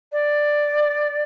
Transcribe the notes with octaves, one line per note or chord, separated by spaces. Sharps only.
D5